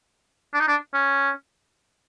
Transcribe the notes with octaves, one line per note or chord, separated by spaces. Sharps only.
D4
D#4
D4
C#4